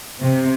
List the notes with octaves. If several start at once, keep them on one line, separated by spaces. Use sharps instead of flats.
C3